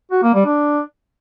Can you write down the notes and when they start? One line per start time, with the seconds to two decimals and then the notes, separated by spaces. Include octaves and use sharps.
0.11 F#4
0.23 A#3
0.34 G3
0.45 D4